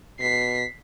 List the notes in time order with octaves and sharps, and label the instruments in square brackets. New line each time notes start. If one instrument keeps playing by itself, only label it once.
[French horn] B2 [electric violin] B6 C7